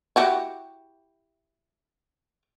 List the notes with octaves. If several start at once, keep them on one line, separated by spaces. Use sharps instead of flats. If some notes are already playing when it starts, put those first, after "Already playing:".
E4 F#4 G4